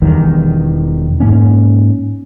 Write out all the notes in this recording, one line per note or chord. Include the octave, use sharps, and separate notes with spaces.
E1 E2 D#3 G3
G#2 A#3 C#4